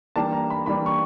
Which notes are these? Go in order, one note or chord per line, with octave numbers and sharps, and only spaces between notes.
E3 G3 A#3 D4 A5
A#5
B5
E3 G3 A#3 D4 B5
C#6